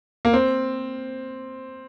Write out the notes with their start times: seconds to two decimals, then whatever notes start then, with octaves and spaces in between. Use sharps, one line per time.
0.25 A#3
0.33 C4